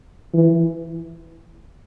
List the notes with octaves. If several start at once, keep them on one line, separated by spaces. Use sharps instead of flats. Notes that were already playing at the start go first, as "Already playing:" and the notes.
E3